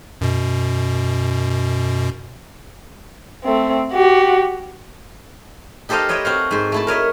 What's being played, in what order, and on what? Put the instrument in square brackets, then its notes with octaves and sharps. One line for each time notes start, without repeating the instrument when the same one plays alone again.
[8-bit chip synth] F#2 B2
[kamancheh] A3 C4
F#4 G4
[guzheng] D#4 G4 A4 C5 D#5 F5
B4 C#5 D#5 E5 G5
C4 F#4 F5
G#2 C5
A3 E4 A5
A#4 C#5 D#5 E5